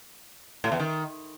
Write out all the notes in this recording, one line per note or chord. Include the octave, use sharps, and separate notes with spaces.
A2
E2
D#3